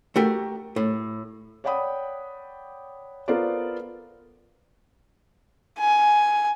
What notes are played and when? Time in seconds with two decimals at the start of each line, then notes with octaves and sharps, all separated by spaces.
0.16 A3 F#4 G4 A#4
0.76 A2
1.64 C#5 D5 F#5 G5 B5 D#6
3.28 B3 F4 A4 A#4 C5 D5
5.80 G#5